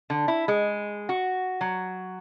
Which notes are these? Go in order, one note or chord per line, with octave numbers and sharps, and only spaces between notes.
D3
E4
G#3
F#4
F#3